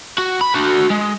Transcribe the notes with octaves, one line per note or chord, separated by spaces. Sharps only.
F#4
B5
D4 F#4
G#3